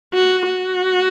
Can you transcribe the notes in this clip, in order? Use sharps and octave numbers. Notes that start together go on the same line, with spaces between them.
F#4
F#4